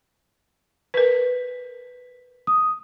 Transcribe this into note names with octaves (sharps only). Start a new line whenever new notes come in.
A#4 B4 B6
D#6